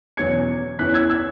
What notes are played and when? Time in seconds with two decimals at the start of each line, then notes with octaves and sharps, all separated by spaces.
0.17 E2 B2 F#3 C#4 G#6 C#7
0.79 E2 E3 C#4 F#6 B6
0.94 E6 G#6
1.09 E6 G#6